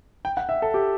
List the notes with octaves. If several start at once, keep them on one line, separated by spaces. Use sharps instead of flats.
G5
F#5
E5
A4
G4